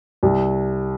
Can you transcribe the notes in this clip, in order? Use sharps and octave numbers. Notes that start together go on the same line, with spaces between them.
C2